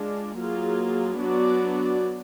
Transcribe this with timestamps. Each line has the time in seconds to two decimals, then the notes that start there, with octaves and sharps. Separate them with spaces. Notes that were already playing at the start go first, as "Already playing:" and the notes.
Already playing: G#3 D4 F4
0.38 F#3 A#3 F4 G#4
1.19 F#3 B3 D4 F#4 D5